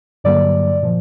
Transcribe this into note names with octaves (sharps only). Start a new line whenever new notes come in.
G2 D3 F#3 A#3 D5
A#2 F3